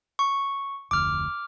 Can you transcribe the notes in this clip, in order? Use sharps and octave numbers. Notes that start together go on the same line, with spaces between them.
C#6
F1 D2 D6 F6